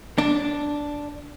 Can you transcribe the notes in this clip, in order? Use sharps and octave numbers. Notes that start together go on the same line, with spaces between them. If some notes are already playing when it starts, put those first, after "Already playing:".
D4